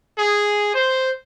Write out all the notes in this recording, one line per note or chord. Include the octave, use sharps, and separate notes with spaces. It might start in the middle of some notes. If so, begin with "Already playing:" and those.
G#4
C5